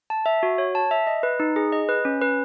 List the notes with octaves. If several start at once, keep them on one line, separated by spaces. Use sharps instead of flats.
A5
E5
F#4
C#5
A5
E5
D#5
B4
D#4
G#4
D#5
B4
C#4
B4